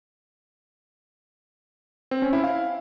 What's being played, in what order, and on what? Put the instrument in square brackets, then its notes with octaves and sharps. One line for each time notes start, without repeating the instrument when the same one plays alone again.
[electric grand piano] C4
C#4
E4
F5